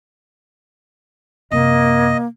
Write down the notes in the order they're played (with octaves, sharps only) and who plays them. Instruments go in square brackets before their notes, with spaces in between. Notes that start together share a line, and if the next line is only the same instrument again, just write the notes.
[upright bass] F#2 C3 [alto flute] A#3 [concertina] D#5